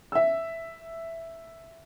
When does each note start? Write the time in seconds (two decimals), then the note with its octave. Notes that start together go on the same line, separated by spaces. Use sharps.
0.12 E5 E6